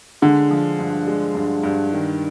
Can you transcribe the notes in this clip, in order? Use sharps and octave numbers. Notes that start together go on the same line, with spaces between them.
D3 G#3
F3
G2
G#3
G2
G2
D#3